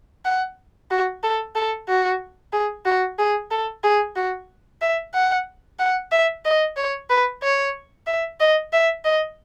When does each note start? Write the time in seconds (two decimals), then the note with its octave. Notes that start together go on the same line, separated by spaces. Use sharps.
0.25 F#5
0.91 F#4
1.23 A4
1.55 A4
1.88 F#4
2.53 G#4
2.86 F#4
3.19 G#4
3.51 A4
3.84 G#4
4.16 F#4
4.82 E5
5.14 F#5
5.79 F#5
6.11 E5
6.45 D#5
6.77 C#5
7.10 B4
7.43 C#5
8.07 E5
8.40 D#5
8.73 E5
9.05 D#5